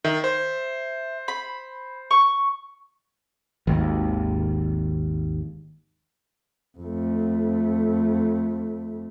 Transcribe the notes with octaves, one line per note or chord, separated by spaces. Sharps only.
D#3 E5
C5
B5
C#6
G#1 D#2
F2 A3